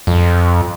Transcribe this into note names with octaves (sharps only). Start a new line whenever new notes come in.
F2